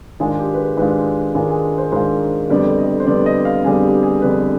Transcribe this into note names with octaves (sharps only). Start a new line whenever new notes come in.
G#2 D#3 G#3 D4 F4 G#4
G4
B4
G#4
G#2 D#3 G#3 D4 F4 B4
G#2 D#3 G#3 D4 F4 G#4
G#4
C5
G#2 D#3 G#3 D4 F4 C5
F2 D3 G3 B3 D5
D#5
C5
F2 D3 G3 B3 D5
D#5
F5
F2 D3 G3 B3 G#4
G4
G#4
F2 D3 G3 B3 B4